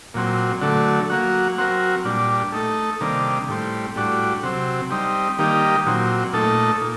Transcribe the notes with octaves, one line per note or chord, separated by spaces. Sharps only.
A#2 F#3 C4
D3 F#3 A3
F#3 A#3 F#4
F#3 C4 F#4 A#4
A#2 G3 D4
A3 D#4 A4
C3 D#3 G3 A#3 D4
A2 G3 C4
A2 G3 D4 F#4
C3 F#3 C4
G3 C4 D#4
D#3 G3 A#3 D#4 G4
A#2 F#3 C4
A#2 A3 D#4 A4
A#2